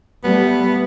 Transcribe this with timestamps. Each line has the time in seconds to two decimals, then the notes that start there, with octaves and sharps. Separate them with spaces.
0.24 G3 A3 B3